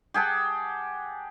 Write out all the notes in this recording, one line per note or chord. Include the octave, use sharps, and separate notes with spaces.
G4 G#4 F#5 A5